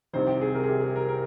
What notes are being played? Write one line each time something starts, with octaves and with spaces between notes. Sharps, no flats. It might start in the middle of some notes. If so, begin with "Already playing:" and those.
C2 C3 D#3 C5
G4
G#4
A#4
G#4
G4
G#4
A#4
A#4